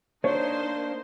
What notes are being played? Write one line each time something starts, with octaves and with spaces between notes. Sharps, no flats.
A#3 D4 D#4 C5 C#5 C6